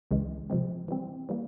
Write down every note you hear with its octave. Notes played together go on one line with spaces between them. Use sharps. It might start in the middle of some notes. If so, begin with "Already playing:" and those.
C#2 C#3 E3 G#3
C3 F3 G#3 C4
E3 G3 C4
E3 G3 A#3